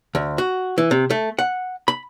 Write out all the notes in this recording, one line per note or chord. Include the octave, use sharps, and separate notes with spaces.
D2
F#4
E3
C3
A3
F#5
B5